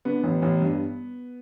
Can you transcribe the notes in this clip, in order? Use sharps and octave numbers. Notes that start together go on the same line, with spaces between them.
D3 B3
A1
A1
G2